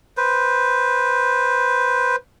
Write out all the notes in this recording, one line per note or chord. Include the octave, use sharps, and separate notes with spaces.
B4 C5